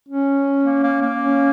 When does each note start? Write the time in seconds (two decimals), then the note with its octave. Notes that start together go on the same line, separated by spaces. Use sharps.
0.09 C#4
0.64 A#3
0.83 A#3
1.01 A#3
1.20 C#4